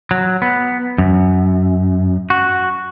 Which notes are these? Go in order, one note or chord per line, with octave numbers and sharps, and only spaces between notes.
F#3
B3
F#2
F#4